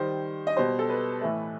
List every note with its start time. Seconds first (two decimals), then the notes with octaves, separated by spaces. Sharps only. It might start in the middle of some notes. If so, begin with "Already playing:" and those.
Already playing: D#3 G3 C5
0.47 D#5
0.56 B2 G3 C5
0.79 A4
0.90 B4
1.21 A2 E3 A3